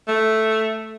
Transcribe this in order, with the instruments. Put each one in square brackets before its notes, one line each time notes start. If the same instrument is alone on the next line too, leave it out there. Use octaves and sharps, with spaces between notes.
[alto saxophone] A3